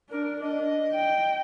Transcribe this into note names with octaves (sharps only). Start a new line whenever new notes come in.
D4 A#4
D#5
G5